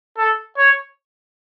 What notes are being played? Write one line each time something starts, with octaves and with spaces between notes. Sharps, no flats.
A4
C#5